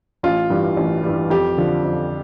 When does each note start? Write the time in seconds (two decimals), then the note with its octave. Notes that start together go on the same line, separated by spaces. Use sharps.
0.23 A1 F4
0.50 G2 E3 G3
0.77 A1
1.04 G2 E3 G3
1.30 F2 G4
1.58 D3 F3
1.84 F2